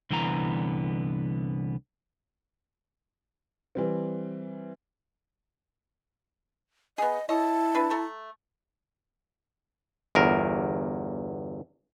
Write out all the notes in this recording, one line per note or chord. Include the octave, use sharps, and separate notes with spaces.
C2 D3 E3 B3 A#5
E3 G3 C4
B3 G#4 D#5
E4 A4 C#5 D#5 A5
D4 B4
A3 A4 A#5
G1 E2 A#4